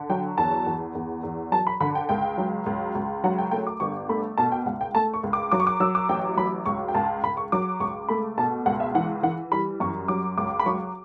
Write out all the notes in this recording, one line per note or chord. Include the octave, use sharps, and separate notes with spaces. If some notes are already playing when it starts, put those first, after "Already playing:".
Already playing: D3
F#3 G5
E2 A5
E2
E2
E2
F#3 A5
B5
D3 B5
G5
C#2 G5
F#3
C#2
C#2
F#3 F#5
G5
A3 G5
D6
G1 C#6
A3 B5
B2 A5
G5
C#2 F#5
G5
A3 A5
C#6
C#2
D6
F#3 D6
C#6
D6
F#3 E6
D6
A1 G5
F#3 B5
C#2 C#6
G5
C#2 A5
C#2 B5
C#6
F#3 D6
C#2 C#6
A3 B5
B2 A5
C#2 F#5
E5
E3 F#5
E3 F#5
G3 B5
F#2 C#6
F#3 D6
C#2 D6
B5
F#3 C#6